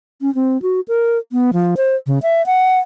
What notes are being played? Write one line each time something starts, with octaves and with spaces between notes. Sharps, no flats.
C#4
C4
F#4
A#4
B3
F3
C5
C#3
E5
F#5